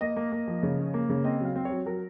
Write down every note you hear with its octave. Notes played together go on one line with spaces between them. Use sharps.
A#3 D#5
A#3
A#3
F3
C#3
C#4
A#3
C#3
C4 D#5
F#3
F5
C4
C#5
F#3
F#3 A#4